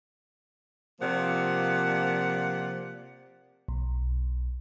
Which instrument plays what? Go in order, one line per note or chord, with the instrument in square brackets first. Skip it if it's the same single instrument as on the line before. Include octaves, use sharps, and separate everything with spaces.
[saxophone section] C3 F3 A#3 D5 F#5
[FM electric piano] B1